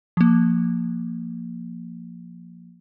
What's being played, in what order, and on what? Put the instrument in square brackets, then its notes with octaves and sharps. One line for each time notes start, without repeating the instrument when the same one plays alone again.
[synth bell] F3 A#3